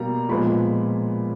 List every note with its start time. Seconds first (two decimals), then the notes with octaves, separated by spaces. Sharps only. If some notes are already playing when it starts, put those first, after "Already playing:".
Already playing: B2 G3 A#3 A#5
0.29 A#2 F3 G#3 B3 B5